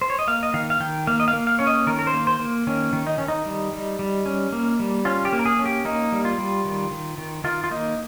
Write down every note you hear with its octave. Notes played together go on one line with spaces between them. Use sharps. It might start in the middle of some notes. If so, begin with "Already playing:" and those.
C5
C#5
D#5
A#3 F5
D#5
D#3 F5
F5
D#3 G5
A#3 F5
D#5
F5
A#3
F5
C#4 C#5
D#5
D#3 A#4
A#4
C5
A#3
C5
A#3
D#3 C#4
D#3
D#4
D#3 C#4
D#4
G3
G3
G3
C#4
A#3
G3
C#4 F4
G4
A#3
A#4
G#4
C#4
G4
A#3 D#4
G3
F4
G3
D#3
D#3
D#3
D#3 F4
F4
A#3 D#4